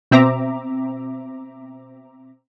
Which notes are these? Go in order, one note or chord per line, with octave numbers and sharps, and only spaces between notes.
B2 C4 E5 A#5 D6